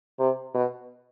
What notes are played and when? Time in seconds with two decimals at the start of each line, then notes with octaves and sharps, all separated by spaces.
0.19 C3
0.54 B2